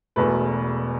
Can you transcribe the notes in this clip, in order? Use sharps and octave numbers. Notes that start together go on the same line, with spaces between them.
E1 E2 B2 A3 B4